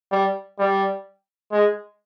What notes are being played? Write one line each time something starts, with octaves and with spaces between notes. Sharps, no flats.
G3
G3
G#3